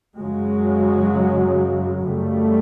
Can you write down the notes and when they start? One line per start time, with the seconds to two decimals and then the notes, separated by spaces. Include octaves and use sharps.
0.19 F#2 C#3 F#3 G#3
2.04 F#2 C#3 G3 A3